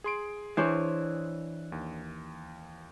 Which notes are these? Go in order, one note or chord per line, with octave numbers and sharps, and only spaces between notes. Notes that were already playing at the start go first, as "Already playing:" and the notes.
G#4 C6 D7
E3 D4 C5 C#5
D#2